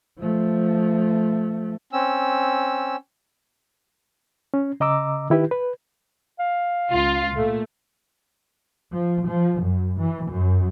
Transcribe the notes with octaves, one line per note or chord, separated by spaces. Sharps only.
F3 A3
C4 C#4 E6
C#4
C#3 D#5 A#5 D6 E6
D#3 E4 G4 B4
B4
F5
C#2 F4
A#2 A3
F3
F3
F#2
E3
F#2